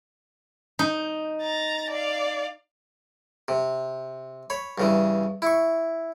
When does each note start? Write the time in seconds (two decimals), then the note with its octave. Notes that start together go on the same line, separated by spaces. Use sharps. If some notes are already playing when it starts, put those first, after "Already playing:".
0.79 D#4
1.42 A#5 A6
1.90 D5 F5
3.48 C3
4.50 C#5 B5
4.78 G2 C#3 E3
5.42 E4 C#6